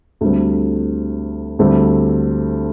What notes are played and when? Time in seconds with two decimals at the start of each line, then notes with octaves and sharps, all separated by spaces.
0.21 D2 D3 G3 C4
1.59 D2 D3 G3 C4